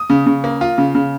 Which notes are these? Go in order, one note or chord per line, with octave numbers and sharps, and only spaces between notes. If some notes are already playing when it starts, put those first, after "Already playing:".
Already playing: D#6
C#3
C#3
A#3
F4
C#3
C#3